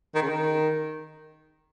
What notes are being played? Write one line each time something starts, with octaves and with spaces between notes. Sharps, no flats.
D#3
C#3
D#3